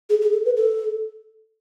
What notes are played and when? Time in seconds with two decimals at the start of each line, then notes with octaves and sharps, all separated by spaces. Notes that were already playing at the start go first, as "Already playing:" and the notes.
0.10 G#4
0.21 G#4
0.33 A4
0.45 B4
0.57 A4